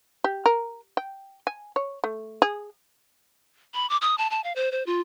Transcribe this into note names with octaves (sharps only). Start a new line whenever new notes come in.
G4
A#4
G5
G#5
C#5
A3
G#4
B5
D6
D#6
A5
A5
F5
C5
C5
F4